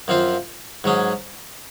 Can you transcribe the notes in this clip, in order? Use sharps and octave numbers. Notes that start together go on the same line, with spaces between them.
F#2 F3 C4 F4 C5
G#2 F#3 C#4 G#4